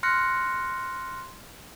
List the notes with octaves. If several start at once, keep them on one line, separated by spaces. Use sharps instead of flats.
C6 F6 F#6 A#6 C#7